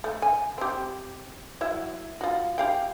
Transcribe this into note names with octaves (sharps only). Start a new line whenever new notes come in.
A3
G#5
C4 G4
F#3 E4 E5
F4 F#4
G4 F5 G5